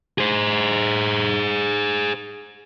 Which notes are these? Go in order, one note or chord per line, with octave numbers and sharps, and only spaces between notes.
G#4 C5